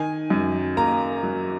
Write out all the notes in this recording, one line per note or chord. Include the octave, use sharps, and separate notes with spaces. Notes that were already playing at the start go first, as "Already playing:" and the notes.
Already playing: D#3 G#5
F#2
A#3 A#5
F#3